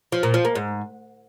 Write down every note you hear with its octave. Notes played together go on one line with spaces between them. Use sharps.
F3
A#2
F3
A#3
G#2